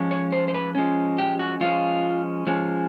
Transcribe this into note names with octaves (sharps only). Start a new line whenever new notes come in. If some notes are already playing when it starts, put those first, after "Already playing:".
Already playing: F3 G#3 C#4
C#5
C5
C5
B4
F3 G#3 C#4
G4
F#4
F3 G#3 C#4 F4
F3 G#3 C#4